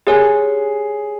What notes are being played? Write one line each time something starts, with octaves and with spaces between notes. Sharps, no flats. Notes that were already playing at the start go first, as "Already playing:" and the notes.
G4 G#4 C#5 G#5